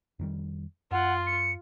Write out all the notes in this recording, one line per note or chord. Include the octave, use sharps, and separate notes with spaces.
F2 D#3 G3
F#2 F4 F#5
C#7